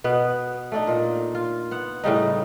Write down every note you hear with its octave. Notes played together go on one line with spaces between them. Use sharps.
B2 B3 B4
A3 D4 D#4
A#2 A#3
F4
B3 F#5
A2 C#3 G3 D#4